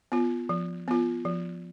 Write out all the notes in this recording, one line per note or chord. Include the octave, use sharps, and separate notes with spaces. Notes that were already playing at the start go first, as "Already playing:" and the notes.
B3 F4
F3
B3 F4
F3